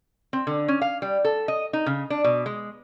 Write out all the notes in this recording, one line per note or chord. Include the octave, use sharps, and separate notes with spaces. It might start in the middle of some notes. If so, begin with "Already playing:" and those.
C4
D3
C#4
F5
G3
A4
D#5
D#4
C#3
D4
B2
G#3